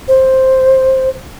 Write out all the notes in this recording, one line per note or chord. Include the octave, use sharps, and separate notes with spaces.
C5